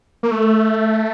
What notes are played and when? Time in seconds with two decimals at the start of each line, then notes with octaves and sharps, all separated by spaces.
0.23 A#3
0.31 A3